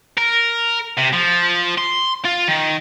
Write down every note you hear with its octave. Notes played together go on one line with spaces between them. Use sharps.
A#4
C3
F3
C6
F4
D#3